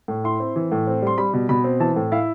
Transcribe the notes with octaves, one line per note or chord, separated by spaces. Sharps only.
A2
E4 C6
C4
E3
A2
C4
G3 C6
G3 B5
B2
B2 B5
C4
E3 A5
A2
E4 F5